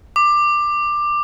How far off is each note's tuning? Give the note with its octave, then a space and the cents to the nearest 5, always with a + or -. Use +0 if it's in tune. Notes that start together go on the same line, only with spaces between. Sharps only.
D6 +15